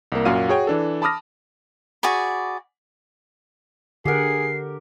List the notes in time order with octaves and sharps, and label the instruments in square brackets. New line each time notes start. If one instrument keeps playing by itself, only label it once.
[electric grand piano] C2 A#3
F#2 A#2 F#4 F5 D#7
F#4 G#4 C#5 G5
E3 D4 A4
A5 B5 D6 D#6 F6 A#6
[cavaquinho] F#4 G#4 D5 B5
[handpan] D3 F#5 [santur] G4 A#4 [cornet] G#4 [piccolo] C7